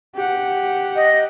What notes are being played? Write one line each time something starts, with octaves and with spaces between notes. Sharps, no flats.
G4 F#5
D#5